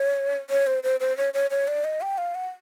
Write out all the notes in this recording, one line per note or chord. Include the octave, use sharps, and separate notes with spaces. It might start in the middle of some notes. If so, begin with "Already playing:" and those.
Already playing: C#5
C#5
C5
C5
C5
C#5
C#5
C#5
D5
D#5
G5
F5
F#5